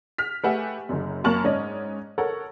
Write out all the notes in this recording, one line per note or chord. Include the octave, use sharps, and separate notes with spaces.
F6 B6
A3 G4 B4 E5 F#5 G#5
F#1 F#2
F#2 A#3 A5 C#6 F6 F#7
G#2 C#4 D5 D#5
A4 A#4 C#5 F#5